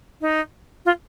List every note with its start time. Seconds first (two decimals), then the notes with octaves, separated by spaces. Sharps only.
0.21 D#4
0.85 F4